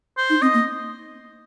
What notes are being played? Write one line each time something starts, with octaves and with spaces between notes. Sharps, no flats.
C5
D#4
C4 D#5
A#3